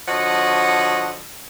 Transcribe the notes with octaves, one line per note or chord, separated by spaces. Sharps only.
D3 F3 F#4 C#5 D#5 F#5